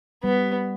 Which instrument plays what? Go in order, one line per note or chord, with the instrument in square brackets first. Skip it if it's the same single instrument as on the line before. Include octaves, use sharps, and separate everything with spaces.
[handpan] G3 [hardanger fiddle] B3